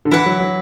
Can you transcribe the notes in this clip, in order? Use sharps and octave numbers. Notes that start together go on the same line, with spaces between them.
D3
E3 E4 B4 F#5
F#3
F#3